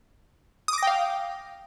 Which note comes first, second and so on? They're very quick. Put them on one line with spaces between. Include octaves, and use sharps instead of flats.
D#6 D6 A#6 G5 F5